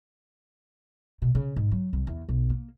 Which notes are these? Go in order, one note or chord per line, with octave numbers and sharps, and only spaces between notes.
B2
C#3
G#2
F#3
C2
E2
B1
A#3